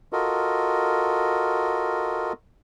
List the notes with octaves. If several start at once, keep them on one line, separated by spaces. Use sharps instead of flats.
F4 F#4 A4 A#4 D#5